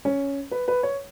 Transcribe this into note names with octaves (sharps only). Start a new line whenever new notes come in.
C#4
B4
B4
C#5